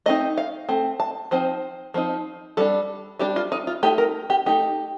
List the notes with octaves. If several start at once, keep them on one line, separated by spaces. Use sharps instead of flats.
A3 C4 D#4 D#5
F5
A3 C4
A5
F3 C4 D#4 C5
F3 C4 D#4
G3 D4 A4
G3 D4 G4
F4
D#4
F4
A3 D#4 G4
A#4
G4
A3 D#4 G4